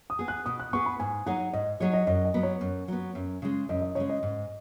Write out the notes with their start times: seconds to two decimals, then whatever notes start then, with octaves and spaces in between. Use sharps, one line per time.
0.10 D#6
0.19 B3 G#4
0.28 F#6
0.46 B2 D#6
0.60 F#6
0.73 B3 G#4 C#6
0.86 B5
1.00 G#2 G#5
1.26 F#3 D#4 G#4 C#5 F#5
1.53 G#2 D#5
1.80 F#3 D#4 G#4 C#5 D#5
1.94 D#5
2.07 F#2 D#5
2.25 D#5
2.34 F#3 B3
2.43 C#5
2.61 F#2
2.88 F#3 B3
3.15 F#2
3.42 C#3 G#3
3.69 F#2 D#5
3.82 D#5
3.95 C#3 G#3 C#5
4.10 D#5
4.23 G#2